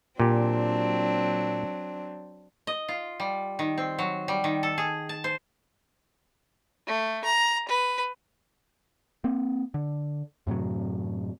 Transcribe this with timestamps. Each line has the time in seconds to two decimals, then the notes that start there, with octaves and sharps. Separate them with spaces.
0.20 A#2 F#3 C4 D4 G4
2.67 D#5
2.88 F4
3.20 G3
3.59 D#3
3.78 C4
3.99 F#3
4.28 G3
4.44 D#3
4.63 A4
4.78 G#4
5.09 A5
5.24 C5
6.87 A3
7.25 A#5
7.69 B4
9.24 A#3 C4
9.74 D3
10.47 F#2 A2 C3 F#3